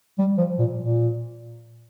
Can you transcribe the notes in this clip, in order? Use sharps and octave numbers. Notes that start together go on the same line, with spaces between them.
G3
F3
A#2
A#2